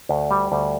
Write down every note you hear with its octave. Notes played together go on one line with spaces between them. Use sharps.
D2
G3
D2